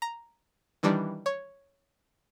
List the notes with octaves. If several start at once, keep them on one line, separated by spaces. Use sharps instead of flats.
A#5
D#3 E3 G3 D4
C#5